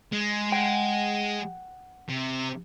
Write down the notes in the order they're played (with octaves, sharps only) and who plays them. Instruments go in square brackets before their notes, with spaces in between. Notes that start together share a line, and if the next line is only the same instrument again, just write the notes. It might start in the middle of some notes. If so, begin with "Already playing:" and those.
[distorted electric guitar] G#3
[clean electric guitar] F#5 G5
[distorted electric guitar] C3